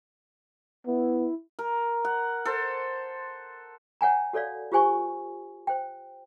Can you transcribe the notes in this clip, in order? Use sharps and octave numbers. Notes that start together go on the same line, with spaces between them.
B3 E4
A#4
F#5
A4 C5
C#5 F#5 G#5 A#5
F#4 A4 C#5 D5 F5
F4 G4 C5 G#5 C#6
C5 G5